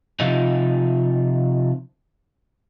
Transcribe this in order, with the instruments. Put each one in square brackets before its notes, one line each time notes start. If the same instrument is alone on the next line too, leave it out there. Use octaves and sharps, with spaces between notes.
[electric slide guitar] C3 F3 D#4 F4